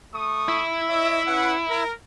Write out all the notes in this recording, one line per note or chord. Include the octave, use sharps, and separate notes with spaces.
A3 C#6 D#6
E4
C#5 D#5 E5
C#4 B4 F#5
A#4